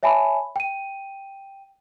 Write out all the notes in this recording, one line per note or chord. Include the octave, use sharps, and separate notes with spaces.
C#5 E5 G#5 A5 B5
G5 D#7